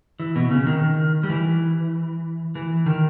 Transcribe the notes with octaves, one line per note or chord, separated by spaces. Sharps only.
E3
B2
C#3
D#3
G3
E3
E3
D#3